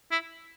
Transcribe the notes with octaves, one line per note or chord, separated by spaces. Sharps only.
E4